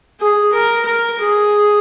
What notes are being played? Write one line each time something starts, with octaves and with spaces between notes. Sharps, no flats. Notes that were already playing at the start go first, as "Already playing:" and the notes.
G#4
A#4
A#4
G#4